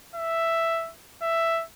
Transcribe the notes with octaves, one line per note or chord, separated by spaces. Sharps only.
E5
E5